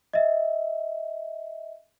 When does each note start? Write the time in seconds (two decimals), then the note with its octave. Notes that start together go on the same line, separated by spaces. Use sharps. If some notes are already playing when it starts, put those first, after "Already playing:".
0.13 D#5 E5